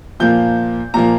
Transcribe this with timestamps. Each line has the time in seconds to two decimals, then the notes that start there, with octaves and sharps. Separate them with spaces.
0.20 A#2 F3 A#3 G6
0.94 A#2 F3 A#3 A#5